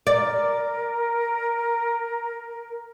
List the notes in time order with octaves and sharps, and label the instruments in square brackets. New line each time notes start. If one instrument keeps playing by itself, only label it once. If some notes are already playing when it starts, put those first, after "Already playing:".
[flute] A#4 [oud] D5